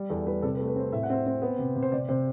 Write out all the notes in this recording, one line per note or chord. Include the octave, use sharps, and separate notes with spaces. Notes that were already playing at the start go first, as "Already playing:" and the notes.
Already playing: G3
E2 A4
G3 B4
C3 A4
B4
A3 A4
B4
C4 C5
A2 E5
F#5
C4 E5
C4
B3
C3
C3
C5
C3 D5
C3 C5